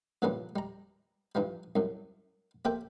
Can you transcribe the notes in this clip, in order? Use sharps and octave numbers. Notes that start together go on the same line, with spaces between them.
G2 A#2 C#3 E3 F3 G3
G3 A#5
G2 E3 F3 G3
C2 F#2
A#3 C4 G4 A4 E5 G5